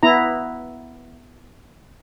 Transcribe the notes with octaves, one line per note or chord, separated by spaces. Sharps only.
B3 E4 A#5